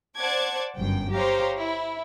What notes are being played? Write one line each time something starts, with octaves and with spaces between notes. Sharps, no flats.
C5 D5 F#5 A5 D6 G#6
G1 F#2 G5
G4 C5 C#5 F5 A#5
E4